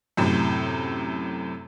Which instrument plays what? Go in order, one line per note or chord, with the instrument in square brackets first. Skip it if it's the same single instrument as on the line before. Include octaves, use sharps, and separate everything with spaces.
[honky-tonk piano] F#2 A2 C3